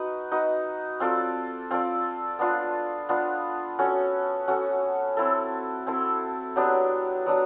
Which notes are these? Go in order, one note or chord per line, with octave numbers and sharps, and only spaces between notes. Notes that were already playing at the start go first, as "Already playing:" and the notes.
Already playing: D#4 F#4 B4
D#4 F#4 B4
C4 F4 A4 D5
C4 F4 A4 D5
B3 D4 F4
B3 D4 F4
C#4 F#4 A4
C#4 F#4 A4
C4 E4 A4
C4 E4 A4
F#3 B3 D4 G4
F#3 B3 D4